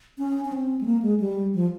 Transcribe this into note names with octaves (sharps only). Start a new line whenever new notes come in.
C#4
C#4
C4
G#3
A#3
G#3
G3
F3